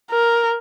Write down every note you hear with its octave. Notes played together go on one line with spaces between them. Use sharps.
A#4